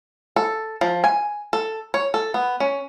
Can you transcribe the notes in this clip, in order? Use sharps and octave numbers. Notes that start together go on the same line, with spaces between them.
A4
F3
G#5
A4
C#5
A4
B3
C#4